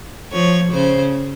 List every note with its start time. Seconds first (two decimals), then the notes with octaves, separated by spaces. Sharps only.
0.32 F3 C#5
0.72 C#3 C5